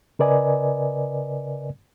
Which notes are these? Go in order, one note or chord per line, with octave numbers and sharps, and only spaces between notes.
C#3 A#4 B4 D5 D#5 G#5